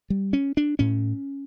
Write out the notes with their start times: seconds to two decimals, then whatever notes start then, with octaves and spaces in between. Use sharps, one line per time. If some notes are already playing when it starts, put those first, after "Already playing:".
0.10 G3
0.33 C#4
0.57 D4
0.79 A2 C#4